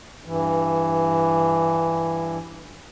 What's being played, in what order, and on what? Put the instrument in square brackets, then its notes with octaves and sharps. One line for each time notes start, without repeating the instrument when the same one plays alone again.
[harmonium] G2 E3